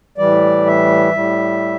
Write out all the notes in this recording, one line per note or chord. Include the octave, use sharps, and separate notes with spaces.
A2 E3 G3 D5
E5
A2 G3